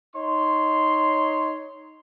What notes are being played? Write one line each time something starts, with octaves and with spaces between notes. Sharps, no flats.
D#4 C#5 C6